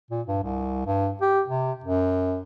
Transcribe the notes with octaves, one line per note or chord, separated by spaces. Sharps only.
A#2
G2
C2
G2
G4
C3
F#2